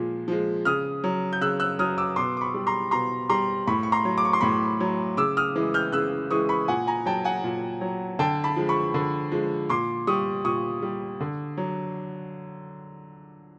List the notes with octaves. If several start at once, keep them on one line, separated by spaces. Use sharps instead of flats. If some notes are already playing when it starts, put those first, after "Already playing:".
Already playing: A#2 F3 G#3
F3 G#3
C#3 D#6 F6
F#3
G6
C#3 E6 F#6
E6 F#6
F#3 D#6 F6
D6 E6
B2 C6 D6
D6
B5 C#6
G3
A#5 C6
B2 A#5 C6
G3 A#5 C6
A2 B5 C#6
C#6
A#5 C6
F#3
D6
C#6
C6
A2 B5 C#6
F#3
C#3 D6 E6
D#6 F6
E3 G#3
F6 G6
C#3 E6 F#6
E3 G#3 C#6 D#6
B5 C#6
A#2 F#5 G#5
G#5 A#5
F#3 G5 A5
F#5 G#5
A#2
F#3
D3 G5 A5
A5 B5
F3 G#3
B5 C#6
D3
F3 G#3
A#2 C6 D6
G3 C#6 D#6
A#2 C#6 D#6
G3
D3
F#3